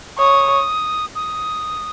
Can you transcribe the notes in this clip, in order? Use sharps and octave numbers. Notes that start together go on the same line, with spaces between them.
C#5 D#6
D#6